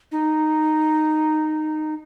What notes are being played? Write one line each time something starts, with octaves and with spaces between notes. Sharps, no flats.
D#4